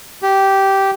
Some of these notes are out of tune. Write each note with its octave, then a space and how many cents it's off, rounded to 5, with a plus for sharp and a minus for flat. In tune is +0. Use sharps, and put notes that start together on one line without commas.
G4 -10